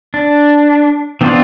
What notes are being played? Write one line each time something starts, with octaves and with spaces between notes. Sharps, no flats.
D4
E3 B3 C4 D4 F4